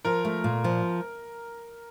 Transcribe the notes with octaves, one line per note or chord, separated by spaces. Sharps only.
F3 A#4
A3
A#2
F3